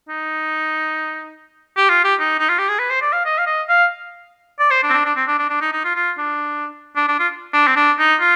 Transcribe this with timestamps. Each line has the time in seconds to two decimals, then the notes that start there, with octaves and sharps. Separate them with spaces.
0.09 D#4
1.77 G4
1.89 F4
2.04 G4
2.20 D#4
2.39 D#4
2.49 F4
2.59 G4
2.69 G#4
2.79 B4
2.90 C5
3.02 D5
3.13 F5
3.25 D#5
3.38 F5
3.46 D#5
3.69 F5
4.59 D5
4.71 C5
4.83 D4
4.90 C4
4.93 D4
5.05 D4
5.16 C4
5.27 D4
5.39 D4
5.50 D4
5.61 D#4
5.73 D#4
5.85 F4
5.95 F4
6.18 D4
6.96 D4
7.08 D4
7.19 F4
7.53 D4
7.67 C4
7.76 D4
7.99 D#4
8.20 F4